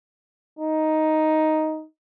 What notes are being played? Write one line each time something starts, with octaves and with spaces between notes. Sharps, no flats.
D#4